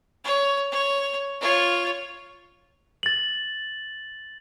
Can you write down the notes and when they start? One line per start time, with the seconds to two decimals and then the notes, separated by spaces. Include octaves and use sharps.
0.24 C#5
0.72 C#5
1.41 F4 C#5
3.03 A6 F#7